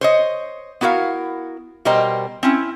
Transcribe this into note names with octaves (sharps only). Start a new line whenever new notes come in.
C5 C#5 D#5
B3 E4 F#4 A#4 F5
B2 G3 A#4 C5 D#5 G5
C4 C#4 E4